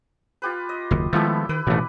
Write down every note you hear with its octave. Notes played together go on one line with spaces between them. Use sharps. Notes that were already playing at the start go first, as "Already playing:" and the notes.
F4 G4 B4
D#5
F#1 D#2
D#3 F3 G#3 A3 B3 E4 G4
D#3 B4
A1 D#2 B2 E3 A3